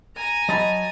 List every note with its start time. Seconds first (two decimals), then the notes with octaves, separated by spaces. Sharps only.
0.16 G#5 A#5
0.49 F#3 D#5 A5 B5 A6